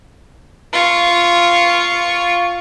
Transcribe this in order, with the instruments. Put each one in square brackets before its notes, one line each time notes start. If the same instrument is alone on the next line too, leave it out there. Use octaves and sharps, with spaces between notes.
[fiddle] F4 C#6